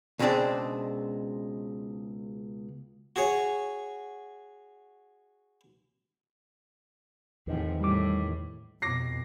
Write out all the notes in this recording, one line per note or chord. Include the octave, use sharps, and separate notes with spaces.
C#2 B2 G#3 C4 D4 D5
F#4 G#4 C#5
E2 A2 C3 D#3 F3
A2 G3 D6
F2 B2 D6 A#6 C7